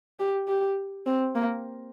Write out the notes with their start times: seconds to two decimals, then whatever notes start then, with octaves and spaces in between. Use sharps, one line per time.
0.19 G4
0.48 G4
1.06 C4
1.35 A#3